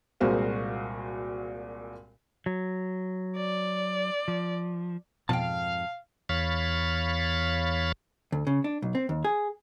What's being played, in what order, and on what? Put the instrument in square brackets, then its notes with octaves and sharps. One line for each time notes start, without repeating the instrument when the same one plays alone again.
[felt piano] C2 A#2 G#3 F#4 C5 F5
[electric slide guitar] F#3
[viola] D5
[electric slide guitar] F3
[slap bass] F2 G#2 F3 [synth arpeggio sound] B2 [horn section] F5 [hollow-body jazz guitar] G5 A5
[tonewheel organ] E2 C#5 F5 B5 A6
[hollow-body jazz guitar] D2
C#3
D4
B1
C4
D#2
G#4